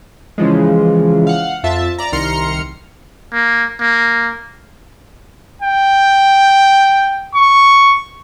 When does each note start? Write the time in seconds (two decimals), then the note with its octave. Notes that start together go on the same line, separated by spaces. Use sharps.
0.38 C#3 E3 F3 G#3
1.27 F5 F#5
1.63 F2 F4 E5 A5
1.98 D5 A#5
2.12 C2 D#3 A#5 C6 F6 C#7
3.33 A#3
3.80 A#3
5.62 G5
7.35 C#6